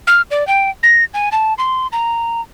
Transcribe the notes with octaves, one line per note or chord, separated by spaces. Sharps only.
F6
D5
G5
A#6
G#5
A5
C6
A#5